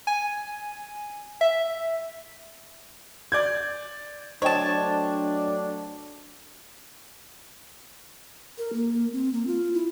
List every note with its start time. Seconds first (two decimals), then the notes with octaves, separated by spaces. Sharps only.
0.07 G#5
1.41 E5
3.32 D5 G6 G#6
4.42 F#3 A3 D4 C5 C#5 D#5 G5 A5
8.58 A#4
8.73 A#3
9.13 C4
9.33 A#3
9.47 F4
9.74 E4